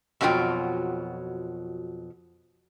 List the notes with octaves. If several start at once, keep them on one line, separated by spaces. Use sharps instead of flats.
F2 B2 F#3 E4 F4 G5